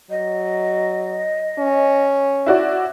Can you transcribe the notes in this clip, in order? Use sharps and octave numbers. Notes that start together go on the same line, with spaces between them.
F#3 D#5
C#4
E4 F#4 D5